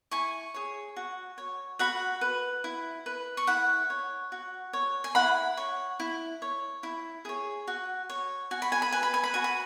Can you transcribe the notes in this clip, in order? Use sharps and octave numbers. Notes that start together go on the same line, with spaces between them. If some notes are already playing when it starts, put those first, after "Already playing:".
E4 G#5 C#6
G#4 C#5
F#4
C#5
F#4 F#5 B5
B4
E4
B4
C#6
E4 F#5 B5
C#5
F#4
C#5
G#5
E4 F#5 B5
C#5
E4
C#5
E4
G#4 C#5
F#4
C#5
F#4 G#5
B5
G#5
B5
B4 G#5
B5
G#5
B5
F#4 G#5
B5